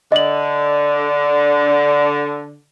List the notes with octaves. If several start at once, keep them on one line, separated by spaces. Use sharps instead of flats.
D3 D#5 F#7